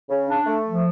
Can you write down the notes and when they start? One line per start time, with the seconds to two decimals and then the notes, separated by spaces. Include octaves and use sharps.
0.10 C#3
0.28 D4
0.47 A3
0.67 F3